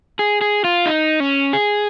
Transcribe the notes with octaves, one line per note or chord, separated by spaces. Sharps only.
G#4
G#4
F4
D#4
C#4
G#4